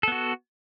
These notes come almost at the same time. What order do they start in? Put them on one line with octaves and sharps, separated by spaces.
A4 B3 F#4